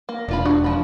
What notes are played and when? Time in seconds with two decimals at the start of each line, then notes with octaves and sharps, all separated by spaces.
0.09 A#3
0.29 E1 D4 F4 B5
0.46 D4 F#4
0.64 F3 B5